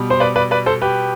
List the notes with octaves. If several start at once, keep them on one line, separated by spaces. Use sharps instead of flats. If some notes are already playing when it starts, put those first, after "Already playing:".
Already playing: B2 G3
C5
B4 D5
B4 D5
B4 D5
A4 C5
G4 B4